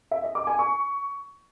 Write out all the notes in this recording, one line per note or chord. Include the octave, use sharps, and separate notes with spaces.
E5
D#5
D6
G#5
C#6